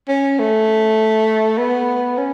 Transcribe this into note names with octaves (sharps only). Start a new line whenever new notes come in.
C#4
A3
B3
C#4